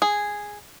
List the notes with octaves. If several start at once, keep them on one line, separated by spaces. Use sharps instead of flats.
G#4